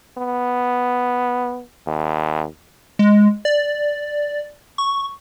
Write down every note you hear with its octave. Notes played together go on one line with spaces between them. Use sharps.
B3
D#2
G#3
D5
C#6